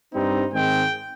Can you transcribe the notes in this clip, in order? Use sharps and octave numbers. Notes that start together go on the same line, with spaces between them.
G2 G3 C4 D#4
G#2 D#3 G#3 C4 G5